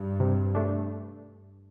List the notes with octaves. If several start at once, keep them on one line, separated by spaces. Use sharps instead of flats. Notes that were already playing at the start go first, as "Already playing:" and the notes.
Already playing: G2
C3
A3 D4